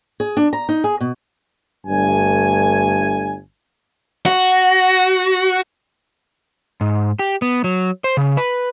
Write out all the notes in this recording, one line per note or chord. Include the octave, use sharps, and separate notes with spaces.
G#4
D4
A#5
D#4
G#4
B2
G1 G2 A3 G#5
F#4
G#2
G4
B3
F#3
C5
C#3
B4